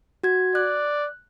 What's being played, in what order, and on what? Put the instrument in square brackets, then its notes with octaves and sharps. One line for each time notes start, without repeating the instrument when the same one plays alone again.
[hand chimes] F#4 G#6
[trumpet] D5 [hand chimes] F#6